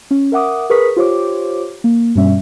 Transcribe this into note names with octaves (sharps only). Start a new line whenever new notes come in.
C#4
A#4 E5 F#5 D6 D#6
G#4 A#4 B4 C#6 D#6 B6
F4 G4 C5 C#5 D6
A#3
G2 B2 G3 C#4 E5